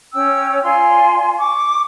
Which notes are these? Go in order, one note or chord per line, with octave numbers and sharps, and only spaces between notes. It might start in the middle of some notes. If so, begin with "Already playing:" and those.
C#4 C#5 G5 E6
F4 D5 G#5 C6
C#6 D6